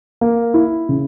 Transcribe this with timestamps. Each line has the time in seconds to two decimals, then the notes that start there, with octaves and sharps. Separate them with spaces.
0.21 A#3
0.54 E4
0.89 C#3